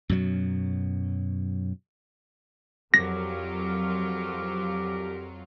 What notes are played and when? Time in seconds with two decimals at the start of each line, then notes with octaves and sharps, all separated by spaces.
0.09 F#2 B2 F#3
2.94 C2 F2 F#3 F4 G4 A#4 A#6